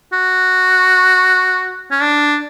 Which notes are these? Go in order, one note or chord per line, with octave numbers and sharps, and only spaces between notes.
F#4
C#4
D4